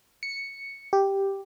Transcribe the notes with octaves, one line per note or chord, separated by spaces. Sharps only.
C#7
G4